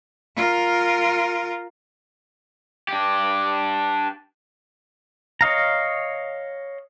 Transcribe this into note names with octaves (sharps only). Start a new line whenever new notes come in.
F4 A#4
D4 G4
C#5 D#5 F5 A#5